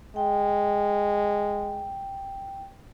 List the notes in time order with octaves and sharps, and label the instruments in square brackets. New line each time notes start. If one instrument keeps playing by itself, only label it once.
[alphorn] G#3 [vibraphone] G5